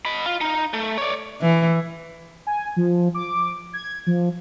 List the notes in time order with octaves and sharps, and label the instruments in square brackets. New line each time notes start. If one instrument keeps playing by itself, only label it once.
[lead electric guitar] D#5 B5
F4
D#4
A3
C#5 D5
[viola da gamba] E3
[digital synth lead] G#5
F3
D6
G#6
F3